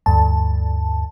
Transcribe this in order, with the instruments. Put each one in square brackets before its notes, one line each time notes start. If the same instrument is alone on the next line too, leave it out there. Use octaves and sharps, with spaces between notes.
[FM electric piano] D2 G2 A5